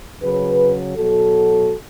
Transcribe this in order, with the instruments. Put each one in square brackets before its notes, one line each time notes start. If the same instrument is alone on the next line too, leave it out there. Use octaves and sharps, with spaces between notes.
[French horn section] C#3 F#3 G#4 B4
B2 F#3 F#4 A4